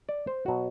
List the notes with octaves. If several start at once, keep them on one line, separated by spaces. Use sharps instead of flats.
D5
C5
B2 F#3 F#4